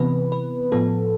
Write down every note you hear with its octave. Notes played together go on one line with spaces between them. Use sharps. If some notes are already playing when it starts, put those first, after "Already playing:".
Already playing: C3 E3 B3 B4
B4
A2 F3 B3 A4